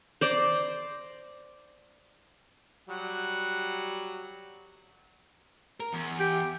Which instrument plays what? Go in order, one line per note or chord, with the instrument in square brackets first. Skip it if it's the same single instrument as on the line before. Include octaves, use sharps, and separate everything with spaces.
[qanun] C5 D5 A#5
[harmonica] F#3 G3 F#5
[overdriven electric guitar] A#4
E2
[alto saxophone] G4